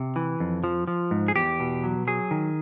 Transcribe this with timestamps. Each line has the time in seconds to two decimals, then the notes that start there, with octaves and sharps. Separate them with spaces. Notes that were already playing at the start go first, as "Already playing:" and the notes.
Already playing: C3
0.16 E3
0.40 F2
0.64 F3
0.88 F3
1.11 G#2
1.28 G#4
1.36 E2 G4
1.60 B2
1.83 F#3
2.07 F#3 G#4
2.31 D#3